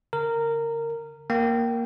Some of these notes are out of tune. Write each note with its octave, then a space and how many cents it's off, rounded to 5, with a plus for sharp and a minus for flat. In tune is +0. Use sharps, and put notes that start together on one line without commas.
D3 -40 A#4 -15
A#3 +0 G5 -20